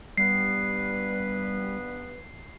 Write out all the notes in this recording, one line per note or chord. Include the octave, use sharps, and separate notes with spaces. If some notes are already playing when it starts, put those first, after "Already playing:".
G2 G3 B3 B4 C7